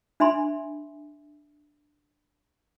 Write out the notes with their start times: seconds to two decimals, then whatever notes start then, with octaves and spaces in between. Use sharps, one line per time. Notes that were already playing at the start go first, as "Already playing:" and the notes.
0.20 D4 E5 G#5 B5 C6